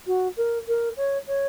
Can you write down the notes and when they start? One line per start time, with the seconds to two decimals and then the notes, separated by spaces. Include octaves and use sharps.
0.07 F#4
0.37 A#4
0.68 A#4
0.97 C#5
1.27 C#5